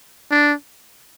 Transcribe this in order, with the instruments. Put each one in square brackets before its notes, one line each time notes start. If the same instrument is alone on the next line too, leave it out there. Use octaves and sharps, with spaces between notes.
[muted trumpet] D4